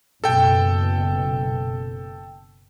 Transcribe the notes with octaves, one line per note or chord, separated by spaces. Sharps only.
F#1 B2 A4 G5